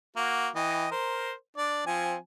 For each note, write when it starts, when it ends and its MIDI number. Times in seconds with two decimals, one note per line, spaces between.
0.16 0.48 58
0.16 0.48 66
0.55 0.87 52
0.55 0.87 75
0.55 0.87 79
0.91 1.32 70
0.91 1.32 72
1.57 1.86 62
1.57 1.86 74
1.87 2.16 53
1.87 2.16 60
1.87 2.16 80